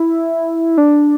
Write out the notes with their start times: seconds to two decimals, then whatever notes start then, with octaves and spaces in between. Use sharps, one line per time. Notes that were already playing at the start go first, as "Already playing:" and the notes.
Already playing: E4
0.77 D4